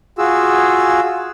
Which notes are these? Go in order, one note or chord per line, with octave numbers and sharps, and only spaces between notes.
F4 F#4 G#4 E6